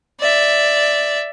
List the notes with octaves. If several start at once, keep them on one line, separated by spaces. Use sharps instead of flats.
D5 E5